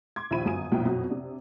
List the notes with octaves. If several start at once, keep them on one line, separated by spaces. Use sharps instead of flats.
C6 D6 G#6
A#1 D#2 F3 E5 B5 D#7
G1 F#2 F3 G#5 D#6 D#7
B1 F#2 A#2 F3 E4 G5
F2 B2 F#3 F#4
C3 D4